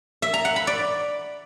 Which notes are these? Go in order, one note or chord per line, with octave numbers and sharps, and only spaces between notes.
E5
A#5
F#5
B5
D5